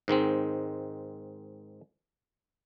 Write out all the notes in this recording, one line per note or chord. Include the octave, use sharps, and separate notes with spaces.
G#2 D#3 G#3 C4